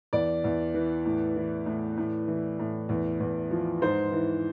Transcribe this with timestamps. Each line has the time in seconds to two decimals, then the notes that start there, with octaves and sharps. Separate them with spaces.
0.13 E2 D5
0.44 E2
0.74 E3
1.05 A2
1.36 E3
1.66 A2
1.97 A2
2.28 E3
2.59 A2
2.89 E2
3.20 E2
3.51 F3
3.81 G#2 C5
4.12 E3